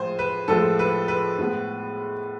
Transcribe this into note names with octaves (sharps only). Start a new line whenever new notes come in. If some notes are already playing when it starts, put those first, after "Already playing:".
Already playing: A2 F3 G#3 C5 G#5
B4
A2 F3 G#3 A4
B4
B4
A2 G#3 B3